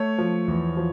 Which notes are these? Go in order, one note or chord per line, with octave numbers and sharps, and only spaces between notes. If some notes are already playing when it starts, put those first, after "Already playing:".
Already playing: A3 C#5
F3
E2
F3